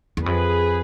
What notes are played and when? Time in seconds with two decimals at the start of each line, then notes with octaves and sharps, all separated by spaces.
0.17 E2
0.26 F2 G#4 B4